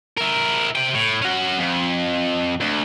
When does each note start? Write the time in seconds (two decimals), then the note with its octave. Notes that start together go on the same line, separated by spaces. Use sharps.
0.17 E4 A#4
0.76 C3 G5
0.94 A2
1.22 C#4 F#4
1.59 F2
2.61 D2